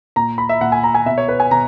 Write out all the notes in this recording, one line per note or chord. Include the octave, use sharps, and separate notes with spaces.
A#2 A#5
B5
E5
A#2 F#5
G#5
A#5
G#5
B2 E5
C#5
B4
G#5
B2 A#5